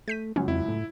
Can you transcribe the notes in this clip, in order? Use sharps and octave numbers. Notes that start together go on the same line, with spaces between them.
A3 G6 B6 D#7
C#2 F#2 C#4
F2 E4
A2